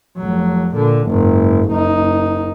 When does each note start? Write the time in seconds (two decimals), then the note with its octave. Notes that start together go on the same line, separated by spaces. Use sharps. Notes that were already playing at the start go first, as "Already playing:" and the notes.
0.17 F1 F#3
0.73 A#2 D3
1.07 F#1 G#2
1.71 F#1 D#4